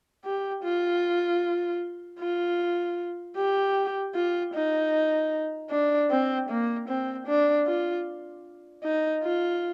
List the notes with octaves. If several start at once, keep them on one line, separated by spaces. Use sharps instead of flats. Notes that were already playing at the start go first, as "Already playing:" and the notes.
G4
F4
F4
G4
F4
D#4
D4
C4
A#3
C4
D4
F4
D#4
F4